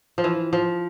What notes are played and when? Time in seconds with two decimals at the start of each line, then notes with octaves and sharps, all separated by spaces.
0.18 F3
0.24 E3
0.53 F3